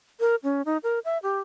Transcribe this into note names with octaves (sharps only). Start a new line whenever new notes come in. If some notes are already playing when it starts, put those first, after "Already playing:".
A#4
C#4
D#4
A#4
E5
G4